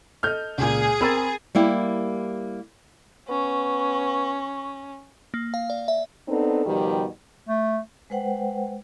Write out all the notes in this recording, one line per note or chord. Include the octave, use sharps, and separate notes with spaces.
A4 D#5 F6 G6
C#2 A#2 G#4
C4 A#4 B5 E6 A6
G3 A#3 E4 G4
B3 C#4 C#6
A#3
F5
D5
E5
B3 C4 D4 D#4 A4
B2 D#3 F3 G3
A3
G#3 B4 C5 F#5 G5